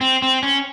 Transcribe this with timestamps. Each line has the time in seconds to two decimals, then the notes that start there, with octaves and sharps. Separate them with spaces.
0.01 C4
0.22 C4
0.43 C#4